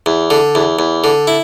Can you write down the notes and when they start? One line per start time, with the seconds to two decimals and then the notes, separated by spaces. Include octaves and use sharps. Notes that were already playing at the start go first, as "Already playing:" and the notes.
0.06 E2
0.30 D3
0.55 E2
0.79 E2
1.04 D3
1.27 E4